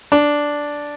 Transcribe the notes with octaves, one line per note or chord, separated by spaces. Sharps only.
D4